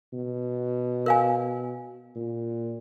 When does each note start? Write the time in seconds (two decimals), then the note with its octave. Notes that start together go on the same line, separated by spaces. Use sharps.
0.13 B2
1.06 A#4 F5 G#5
2.16 A#2